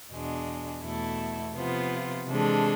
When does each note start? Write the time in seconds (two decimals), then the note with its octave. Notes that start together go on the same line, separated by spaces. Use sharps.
0.11 E2 B2 G#3 D4
0.83 E2 B2 A3 E4 A4
1.55 C3 F3 B3 F4
2.27 C3 E3 G#3 D4 A4